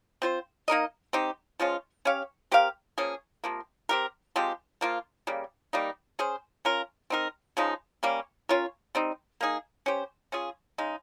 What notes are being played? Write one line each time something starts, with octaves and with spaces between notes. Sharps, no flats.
C4 F4 C5
A#3 D#4 A#4 D#5
C4 D#4 G4
F3 G#3 C#4 F4
C#4 G4 C#5 F5
C4 G4 A#4 F5
F3 A#3 C#4 G#4
C3 F3 A#3
C4 G4 A#4
F3 G#3 C4 G4
F3 A#3 F4
C#3 G3 A#3
G3 A#3 D#4
C#4 G#4 C5
C#4 F4 A#4
C4 D#4 A#4
C#3 F3 G#3 D#4
G3 A#3 C#4
C#4 F4 A#4 C#5
G3 C4 D#4
A#3 D#4 G#4
C#4 G4 C5
C#4 F4 G#4
C#3 G#3 D#4